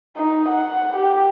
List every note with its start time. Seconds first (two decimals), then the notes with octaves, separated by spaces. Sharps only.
0.17 D#4
0.48 F#5
0.96 G4